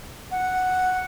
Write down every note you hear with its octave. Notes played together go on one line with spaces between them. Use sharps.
F#5